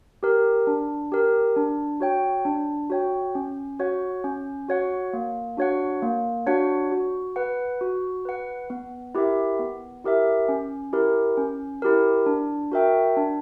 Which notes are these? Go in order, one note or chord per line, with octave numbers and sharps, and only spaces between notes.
G4 A#4
D4
G4 A#4
D4
F#4 C#5 G5
D4
F#4 C#5 G5
C#4
F#4 C#5 F#5
C#4
F#4 C#5 F#5
A#3
D4 F#4 C#5 F#5
A#3
D4 F#4 C#5 F#5
F#4
B4 F#5
F#4
B4 F#5
B3
E4 G4 A#4 E5
B3
E4 G4 A#4 E5
C#4
E4 G4 A#4
C#4
E4 G4 A#4
D4
F#4 A#4 E5 G5
D4